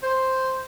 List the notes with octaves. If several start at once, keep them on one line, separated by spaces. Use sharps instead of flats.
C5